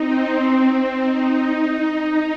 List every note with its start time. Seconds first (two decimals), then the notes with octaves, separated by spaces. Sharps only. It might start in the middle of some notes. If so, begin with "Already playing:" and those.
Already playing: C4 D#4
0.66 C4
1.01 D#4